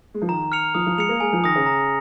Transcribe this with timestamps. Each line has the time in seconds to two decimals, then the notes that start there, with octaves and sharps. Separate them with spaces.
0.14 G#3
0.22 F3
0.28 D#3 A#5
0.52 F6 C#7 F7
0.74 F3 D#6
0.86 F3
0.98 G#3 C#7 F7
1.09 A#3
1.20 G#3 G#5
1.33 F3
1.44 D#3 D#6 A#6
1.55 C#3
1.66 A#5